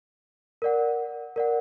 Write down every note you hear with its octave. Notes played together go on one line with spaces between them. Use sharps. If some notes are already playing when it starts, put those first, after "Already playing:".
A#4 D5 F#5
A#4 D5 F#5